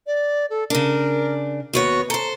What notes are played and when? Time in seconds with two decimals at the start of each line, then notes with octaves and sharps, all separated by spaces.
0.07 D5
0.50 A4
0.70 C#3 D4 A#4
1.73 D#2 B3 F#4 C#5
2.10 A4 C5 A#5